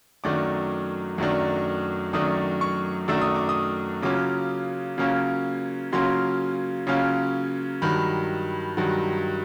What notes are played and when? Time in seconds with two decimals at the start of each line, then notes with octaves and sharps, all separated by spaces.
0.24 F#2 D#3 F#3 A3 D4 D6
1.18 F#2 D#3 F#3 A3 D4
2.13 F#2 D#3 F#3 A3 D4 D#6
2.61 C#6
3.08 F#2 D#3 F#3 A3 D4 E6
3.21 D#6
3.35 D6
3.49 D#6
4.02 C#3 F#3 A#3 C#4 F4 D6
4.98 C#3 F#3 A#3 C#4 F4
5.92 C#3 F#3 A#3 C#4 F4 C6
6.87 C#3 F#3 A#3 C#4 F4
7.82 G2 D#3 F#3 B5
8.77 G2 D#3 F#3